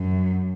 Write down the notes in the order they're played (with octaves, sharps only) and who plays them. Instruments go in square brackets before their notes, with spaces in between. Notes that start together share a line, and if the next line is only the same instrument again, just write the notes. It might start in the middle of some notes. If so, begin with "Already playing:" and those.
Already playing: [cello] F#2